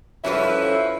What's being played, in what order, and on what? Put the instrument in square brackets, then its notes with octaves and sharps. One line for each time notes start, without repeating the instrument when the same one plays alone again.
[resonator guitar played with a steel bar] G2 A4 B4 [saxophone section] F3 E4 E5 [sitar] C#4 F#4